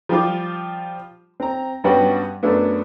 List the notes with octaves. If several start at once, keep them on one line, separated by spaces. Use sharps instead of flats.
F3 G3 F4 D6
C4 A#5
G2 G3 B3 C#4 F#4
F#2 F#3 A3 B3 D4